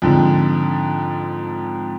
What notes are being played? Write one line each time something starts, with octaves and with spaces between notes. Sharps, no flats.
F2 G#2 D3